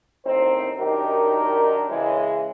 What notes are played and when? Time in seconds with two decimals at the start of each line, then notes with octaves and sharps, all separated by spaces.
0.25 A1 D#2 C4 D#4 C5
0.80 F#2 D#3 D4 D#4 G4 A#4
1.90 C#3 E3 G#3